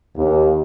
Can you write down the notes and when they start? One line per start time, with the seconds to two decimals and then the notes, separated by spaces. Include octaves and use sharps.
0.17 D#2